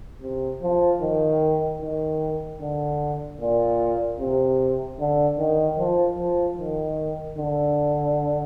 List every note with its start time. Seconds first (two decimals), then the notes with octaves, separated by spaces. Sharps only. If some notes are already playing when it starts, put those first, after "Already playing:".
0.22 C3
0.62 F3
1.01 D#3
1.81 D#3
2.61 D3
3.41 A#2
4.20 C3
5.00 D3
5.39 D#3
5.79 F3
6.18 F3
6.59 D#3
7.38 D3